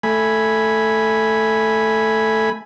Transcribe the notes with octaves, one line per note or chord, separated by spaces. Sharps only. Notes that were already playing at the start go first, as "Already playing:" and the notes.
A3 G#5 B5